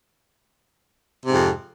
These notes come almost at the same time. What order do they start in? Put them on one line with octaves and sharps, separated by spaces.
C3 G#2 F2